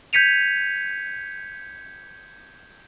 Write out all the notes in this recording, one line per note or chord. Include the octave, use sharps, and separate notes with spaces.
G6 G#6 B6 C#7 D#7 F7